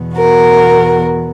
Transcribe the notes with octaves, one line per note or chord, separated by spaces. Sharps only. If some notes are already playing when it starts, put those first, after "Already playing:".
Already playing: E2 B2
F#4 A#4